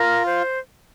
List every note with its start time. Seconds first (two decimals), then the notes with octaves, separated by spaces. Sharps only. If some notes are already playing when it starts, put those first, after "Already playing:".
Already playing: F4 A#4
0.26 C5